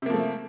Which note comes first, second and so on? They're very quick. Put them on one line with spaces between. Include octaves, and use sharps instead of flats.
C3 A#3 F3 A3